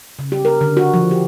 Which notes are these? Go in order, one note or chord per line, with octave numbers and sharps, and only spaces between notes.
C#3
G4
A#4
D3
F#4
F3
G4